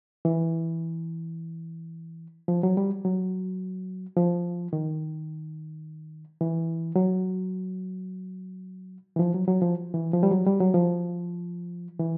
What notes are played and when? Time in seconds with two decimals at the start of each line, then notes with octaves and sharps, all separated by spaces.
0.25 E3
2.48 F3
2.63 F#3
2.77 G3
3.05 F#3
4.17 F3
4.73 D#3
6.41 E3
6.96 F#3
9.16 E3
9.19 F3
9.34 F#3
9.48 F#3
9.61 F3
9.94 E3
10.13 F3
10.23 G3
10.31 F#3
10.46 G3
10.60 F#3
10.74 F3
12.00 E3